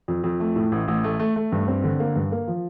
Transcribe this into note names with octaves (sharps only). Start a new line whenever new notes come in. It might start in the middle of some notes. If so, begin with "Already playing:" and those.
F2
F2
A3
A2
A1
A1
A3
A3
A3
G2
C4
D3
A#3
G2
A#3
F3